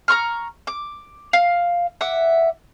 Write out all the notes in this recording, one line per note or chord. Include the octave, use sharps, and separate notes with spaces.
A#5 C6 C#6 F6
D6
F5
E5 F#5 D6